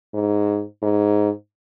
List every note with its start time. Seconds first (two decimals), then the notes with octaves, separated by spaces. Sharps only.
0.14 G#2
0.82 G#2